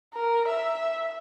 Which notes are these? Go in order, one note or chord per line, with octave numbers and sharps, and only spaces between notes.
A#4
E5